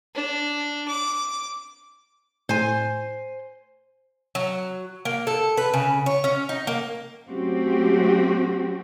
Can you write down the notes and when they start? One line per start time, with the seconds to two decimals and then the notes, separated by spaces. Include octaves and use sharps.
0.14 D4
0.88 D6
2.49 A2 C5 G#5
4.35 F#3
5.05 A#3
5.27 A4
5.57 B4
5.74 C#3
6.06 C#5
6.24 C#4
6.49 D#4
6.67 A#3
7.28 F#3 A3 C4 C#4 F#4 G4